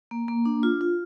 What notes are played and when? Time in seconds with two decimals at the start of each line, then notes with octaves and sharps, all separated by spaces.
0.11 A#3
0.28 A#3
0.45 D4
0.63 F4
0.81 F4